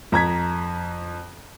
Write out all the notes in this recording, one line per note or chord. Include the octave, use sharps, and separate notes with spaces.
F2 A#5 G#6 B6